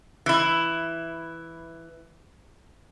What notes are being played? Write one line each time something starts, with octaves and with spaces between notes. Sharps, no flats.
E3 E4